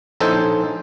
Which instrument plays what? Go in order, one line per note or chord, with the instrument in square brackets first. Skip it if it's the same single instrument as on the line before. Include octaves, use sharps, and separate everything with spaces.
[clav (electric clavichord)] A#1 A2 D#4 A4 C5 G#5